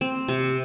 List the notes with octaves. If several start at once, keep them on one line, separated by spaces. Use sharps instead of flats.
C4
C3